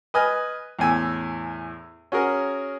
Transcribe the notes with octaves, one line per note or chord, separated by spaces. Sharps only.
B4 D#5 G#5 F6
E2 A2 G#5 E6
C#4 F#4 G#4 A#4